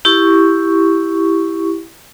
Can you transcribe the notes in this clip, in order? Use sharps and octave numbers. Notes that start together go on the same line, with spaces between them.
E4 G4 C#6